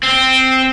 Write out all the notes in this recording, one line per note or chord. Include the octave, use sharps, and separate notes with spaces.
C4